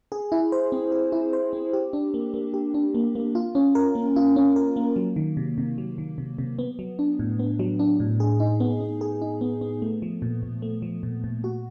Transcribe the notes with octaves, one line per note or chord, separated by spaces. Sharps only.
G#4
E4
C5
C4
G#4
E4
C5
C4
G4
D4
A#3
A#3
G4
D4
A#3
A#3
F4
C#4
A#4
A#3
F4
C#4
A#4
A#3
F#3
D#3
C3
C3
F#3
D#3
C3
C3
B3
F#3
D4
A2
B3
F#3
D4
A2
G#4
D#4
B3
B3
G#4
D#4
B3
B3
A3
F3
A#2
A#2
A3
F3
A#2
A#2
F#4